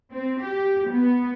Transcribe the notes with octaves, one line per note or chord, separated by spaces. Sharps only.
C4
G4
B3